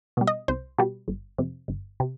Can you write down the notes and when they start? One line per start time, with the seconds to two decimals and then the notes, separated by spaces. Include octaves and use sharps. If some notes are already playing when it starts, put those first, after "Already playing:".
0.17 B2 G3
0.27 D#5
0.48 C2 C5
0.78 B2 G3
1.08 G1
1.38 F2 C3
1.68 G1
2.00 C3